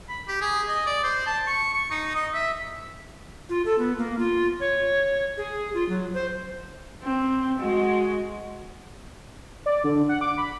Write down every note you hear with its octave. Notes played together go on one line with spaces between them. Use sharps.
B5
G4
G#4
D#5
D5
C5
A5
C#6
C#6
D#4
D#5
E5
F4
A4
B3
A#3
F4
C#5
G#4
F4
F#3
C5
C4
G#3 F#4
D5
D3
F#5
D6
B5